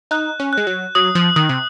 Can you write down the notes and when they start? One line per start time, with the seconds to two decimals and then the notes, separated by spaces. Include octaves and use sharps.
0.11 D#4 F#6
0.40 C#4
0.53 G#3 F#6
0.67 F#3
0.95 F#3 D#6
1.15 F3
1.36 D#3 D#6
1.49 C3